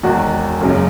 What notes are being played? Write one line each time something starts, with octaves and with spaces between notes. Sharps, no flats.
E1 E2 D#3 F#4
F#1 F#2 C#3